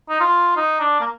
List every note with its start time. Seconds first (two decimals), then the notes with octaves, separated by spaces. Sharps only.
0.09 D#4
0.20 F4
0.57 D#4
0.80 D4
1.01 A#3